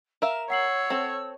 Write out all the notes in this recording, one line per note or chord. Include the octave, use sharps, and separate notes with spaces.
A#4 E5 F5 E7
C#5 F#5 E6 C7 F#7
C4 A4